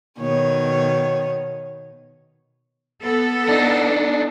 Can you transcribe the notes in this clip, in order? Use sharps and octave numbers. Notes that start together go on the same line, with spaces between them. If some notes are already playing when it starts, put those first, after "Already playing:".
B2 D#3 C#5
B3 A4
D4 D#4